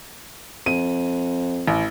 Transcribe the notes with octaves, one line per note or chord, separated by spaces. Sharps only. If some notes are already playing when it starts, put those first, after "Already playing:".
F2 D#7
A1